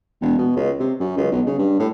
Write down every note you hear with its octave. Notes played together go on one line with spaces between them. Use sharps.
E1
B2
C#2
C3
F#2
C#2
B1
C#3
G2
A2